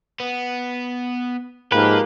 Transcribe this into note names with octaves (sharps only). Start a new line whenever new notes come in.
B3
G#2 F3 A#3 G4 B4